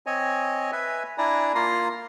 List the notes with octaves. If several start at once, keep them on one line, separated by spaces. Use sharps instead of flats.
C4 C#5 D#5 G#5
B4 E5 G#5
D4 E4 D5 G#5 A#5
A#3 F4 A#5 C6